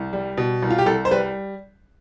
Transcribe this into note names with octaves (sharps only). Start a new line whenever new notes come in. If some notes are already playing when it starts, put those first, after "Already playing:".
Already playing: C2
G3
B2
C2
F4
G4
C2 A4
C5
G3 B4